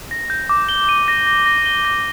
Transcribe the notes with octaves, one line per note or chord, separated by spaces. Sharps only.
A#6
G6
D6
G7
D#7
A#6
A#6
A#6
G7
A#6